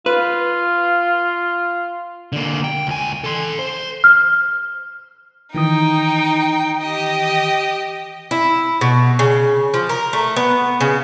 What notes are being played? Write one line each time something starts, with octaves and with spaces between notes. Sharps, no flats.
F4 B4
D3 A#3
G5
C#2 G#5
A4 C6
C5
F6
D#3 E3 D#4 G5 D#6
G4 D#5
E4
B2
C#3
F3
A#4
A3
B3
C#3